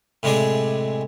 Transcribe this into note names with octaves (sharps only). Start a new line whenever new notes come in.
A2 C3 G#3 D4 G#4